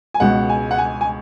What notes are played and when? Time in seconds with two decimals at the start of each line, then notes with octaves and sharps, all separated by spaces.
0.14 G#5
0.20 C#2 B2 G#3 F#5
0.49 G#5
0.71 F#5
0.78 G#5
1.01 G#5